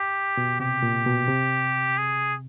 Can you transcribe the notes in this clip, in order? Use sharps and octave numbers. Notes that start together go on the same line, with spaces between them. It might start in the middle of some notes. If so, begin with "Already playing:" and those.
Already playing: G4
B2
C3 G4
A#2
B2
C3
G#4